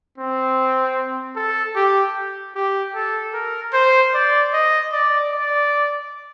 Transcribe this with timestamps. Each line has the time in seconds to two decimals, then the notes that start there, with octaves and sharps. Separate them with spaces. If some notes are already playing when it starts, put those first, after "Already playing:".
0.18 C4
1.36 A4
1.76 G4
2.55 G4
2.95 A4
3.34 A#4
3.73 C5
4.14 D5
4.53 D#5
4.93 D5
5.32 D5